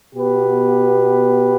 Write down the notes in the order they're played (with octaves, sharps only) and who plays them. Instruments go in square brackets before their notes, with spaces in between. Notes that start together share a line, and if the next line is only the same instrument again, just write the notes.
[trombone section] B2 B3 G4 B4